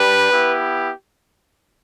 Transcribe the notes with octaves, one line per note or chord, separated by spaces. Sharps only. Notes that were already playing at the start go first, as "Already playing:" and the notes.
Already playing: G3 D4 G4 B4
B3 E4 G4